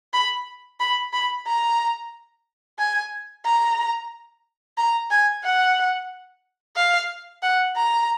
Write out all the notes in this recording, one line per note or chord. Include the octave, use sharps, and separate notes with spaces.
B5
B5
B5
A#5
G#5
A#5
A#5
G#5
F#5
F5
F#5
A#5